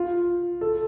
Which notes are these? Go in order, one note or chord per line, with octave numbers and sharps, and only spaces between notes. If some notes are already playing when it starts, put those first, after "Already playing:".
Already playing: F4
A4